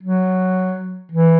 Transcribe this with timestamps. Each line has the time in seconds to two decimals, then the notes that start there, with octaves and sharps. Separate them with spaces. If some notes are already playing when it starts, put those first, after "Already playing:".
0.03 F#3
1.12 E3